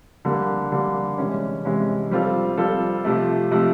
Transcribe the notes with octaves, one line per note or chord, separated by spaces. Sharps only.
D3 G3 A#3
D3 G3 A#3
C3 E3 G#3 C#4
C3 E3 G#3 C#4
G3 C4 F4 A4
G3 C4 F4 A4
C3 F3 A3
C3 F3 A3